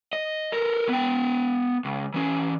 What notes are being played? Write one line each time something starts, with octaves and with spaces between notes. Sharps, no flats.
D#5
A4 A#4
B3 G5
C#2
E3 C#4